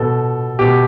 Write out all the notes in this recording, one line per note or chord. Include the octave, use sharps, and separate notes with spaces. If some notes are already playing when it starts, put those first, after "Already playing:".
Already playing: B2 A4
B2 G4